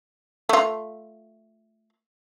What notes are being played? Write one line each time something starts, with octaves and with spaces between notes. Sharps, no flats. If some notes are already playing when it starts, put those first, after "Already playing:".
A3 F4